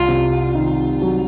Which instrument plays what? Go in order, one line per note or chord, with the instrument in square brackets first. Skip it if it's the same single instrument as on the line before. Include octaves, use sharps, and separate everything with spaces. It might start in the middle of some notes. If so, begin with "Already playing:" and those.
Already playing: [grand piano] C2 [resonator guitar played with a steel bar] F4
[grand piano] C3
D#3
F#3